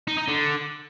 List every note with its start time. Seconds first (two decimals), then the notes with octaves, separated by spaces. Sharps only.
0.08 D#4
0.18 D#4
0.28 D3